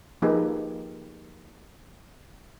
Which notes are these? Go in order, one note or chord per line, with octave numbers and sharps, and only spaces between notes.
F3 A#3 D#4 G4 G#4 B4